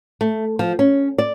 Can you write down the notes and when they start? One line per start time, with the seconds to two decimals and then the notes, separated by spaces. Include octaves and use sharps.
0.21 A3
0.59 F3
0.79 C#4
1.18 D5